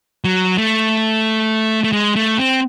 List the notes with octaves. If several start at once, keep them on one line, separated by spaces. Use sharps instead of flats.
F#3
A3
A3
G#3
A3
C4